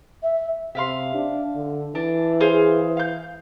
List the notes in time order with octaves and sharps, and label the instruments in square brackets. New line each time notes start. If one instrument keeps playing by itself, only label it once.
[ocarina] E5
[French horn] C3 [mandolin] E5 F5 C6
[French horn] D4
D3
[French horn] E3 [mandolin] D4
[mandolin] G#4 C5 F5
F5 G6